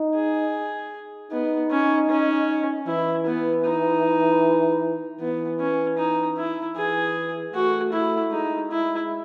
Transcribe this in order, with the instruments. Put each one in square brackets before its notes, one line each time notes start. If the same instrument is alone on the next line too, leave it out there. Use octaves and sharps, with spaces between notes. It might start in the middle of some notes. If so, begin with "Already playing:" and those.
Already playing: [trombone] D#4
[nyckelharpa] G#4
[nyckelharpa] B3 [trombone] D#4
[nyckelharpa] C#4
C#4
[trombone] E3 [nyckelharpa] E4
[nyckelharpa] B3
D#4
[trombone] E3 [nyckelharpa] B3
[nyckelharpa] C#4
D#4
E4
[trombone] E3 [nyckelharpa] G#4
[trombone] A3 [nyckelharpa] F#4
[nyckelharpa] E4
[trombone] G#3 [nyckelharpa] D#4
[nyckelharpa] E4